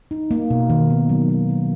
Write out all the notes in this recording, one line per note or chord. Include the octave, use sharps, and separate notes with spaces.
D#4
A#3
B2
D#3
B3
F#3
D#3
D#3